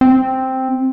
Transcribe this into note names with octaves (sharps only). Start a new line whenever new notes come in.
C4